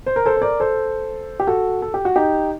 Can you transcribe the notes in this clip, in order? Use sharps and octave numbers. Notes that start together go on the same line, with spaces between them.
C5
A#4
A4 C5
C5
A#4 D5
A4 C5
G4
F#4 A4
A4
G4
F#4
D#4 G4